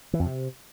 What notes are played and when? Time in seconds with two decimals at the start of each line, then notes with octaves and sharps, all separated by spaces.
0.13 E3
0.20 F2
0.26 C3